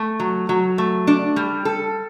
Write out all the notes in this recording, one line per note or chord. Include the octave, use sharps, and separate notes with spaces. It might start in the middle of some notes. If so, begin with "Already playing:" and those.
Already playing: A3
F#3
F#3
A3
D4
G3
A4